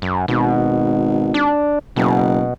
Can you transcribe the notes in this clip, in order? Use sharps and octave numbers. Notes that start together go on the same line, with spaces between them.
F#2
G#1 B2
D4
F#1 B2